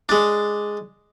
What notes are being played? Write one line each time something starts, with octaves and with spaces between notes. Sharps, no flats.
G#3 D4